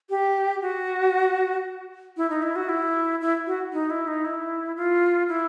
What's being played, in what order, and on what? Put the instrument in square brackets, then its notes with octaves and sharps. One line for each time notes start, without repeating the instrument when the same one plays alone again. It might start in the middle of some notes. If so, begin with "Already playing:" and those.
[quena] G4
F#4
E4
D#4
E4
F#4
E4
E4
F#4
D#4
E4
D#4
E4
F4
E4